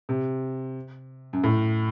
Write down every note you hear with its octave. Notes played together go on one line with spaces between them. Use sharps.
C3
F#2
A2